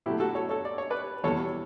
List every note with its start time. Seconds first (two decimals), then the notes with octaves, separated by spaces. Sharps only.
0.06 B2 F#3 A3 E4 G4
0.20 F#4 A4
0.35 A4 C#5
0.49 A4 C#5
0.65 D5
0.78 C#5
0.90 B4 D5
1.24 E2 B2 G3 A4 C#5